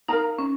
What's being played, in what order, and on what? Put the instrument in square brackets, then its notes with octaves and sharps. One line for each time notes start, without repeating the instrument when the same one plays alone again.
[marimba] D#4 [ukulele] A#4 F5 A#5
[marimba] C#4